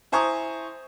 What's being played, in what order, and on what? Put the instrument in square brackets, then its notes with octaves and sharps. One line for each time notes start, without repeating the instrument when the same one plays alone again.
[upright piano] E4 C5 G#5 A#5 C#6 D#6